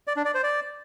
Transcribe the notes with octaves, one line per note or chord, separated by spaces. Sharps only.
D5
D4
D5
C5
D5